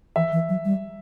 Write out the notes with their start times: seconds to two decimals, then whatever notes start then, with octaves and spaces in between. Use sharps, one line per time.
0.16 E3 E5
0.32 E3
0.49 F#3
0.65 G3